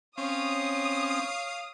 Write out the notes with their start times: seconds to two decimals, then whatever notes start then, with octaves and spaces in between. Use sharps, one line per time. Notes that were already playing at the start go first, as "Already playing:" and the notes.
0.18 C4 C#4 C#5 F5 D#6